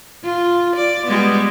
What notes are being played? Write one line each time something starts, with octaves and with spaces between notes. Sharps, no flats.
F4
D5
G3 G#3 B3